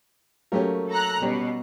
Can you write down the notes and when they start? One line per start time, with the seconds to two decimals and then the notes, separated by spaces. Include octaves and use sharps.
0.52 F#3 A3 A#3 C#4 G4 A#4
0.91 A4 A#5 F#6
1.22 B2 G3 C#4